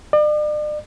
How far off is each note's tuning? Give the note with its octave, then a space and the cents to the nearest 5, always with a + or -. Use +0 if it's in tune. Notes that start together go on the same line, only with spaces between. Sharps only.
D5 +40